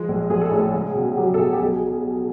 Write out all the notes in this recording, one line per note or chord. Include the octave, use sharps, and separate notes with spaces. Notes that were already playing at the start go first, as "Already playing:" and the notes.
Already playing: F3 G#3
A#1
A#1 G#4
A4
A2 G#4
C#2
B2
F#3 G4
A4
B2 G#4
G4
B1 G#4